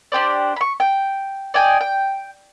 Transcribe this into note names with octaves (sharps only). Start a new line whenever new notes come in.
D4 G4 C5 D5
B5 C#6
G5
D5 D#5 G5 G#5
G5